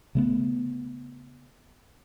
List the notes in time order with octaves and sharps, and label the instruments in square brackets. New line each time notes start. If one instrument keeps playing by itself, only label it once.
[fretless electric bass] C#3 A3 B3